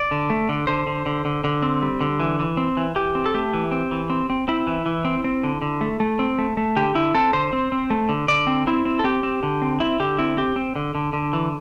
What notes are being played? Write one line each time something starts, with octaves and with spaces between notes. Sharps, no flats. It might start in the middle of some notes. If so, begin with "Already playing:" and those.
Already playing: D5
D3
A3
D3
D3 C5
D3
D3
D3
D3
C4
G3
D3
E3
E3
C4
E3
E3 G4
C4
A4
A3 G4
E3
C4
E3
C4
C4
C4 E4
E3
E3
C4
C4
D3
D3
A3
A3
C4
A3
A3
D3 G4
D3 E4
C4 A4
D3 C5
C4
C4
A3
D3
D3 D5
C4
C4 E4
C4
A4
C4 G4
C4
D3
C4
C4 E4
D3 G4
C4 E4
C4 G4
C4
D3
D3
D3
E3